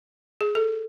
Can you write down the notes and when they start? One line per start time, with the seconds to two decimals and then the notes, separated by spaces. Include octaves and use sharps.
0.41 G#4
0.55 A4